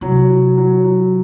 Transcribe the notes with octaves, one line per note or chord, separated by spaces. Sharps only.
C3 F#3
F#3
F#3
F#3